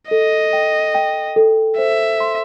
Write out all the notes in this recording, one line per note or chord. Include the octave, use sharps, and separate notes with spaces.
A4 D#5
G5
G5
A4
C5 E5
C6